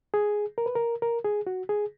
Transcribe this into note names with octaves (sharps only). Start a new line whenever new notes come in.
G#4
A#4
B4
A#4
A#4
G#4
F#4
G#4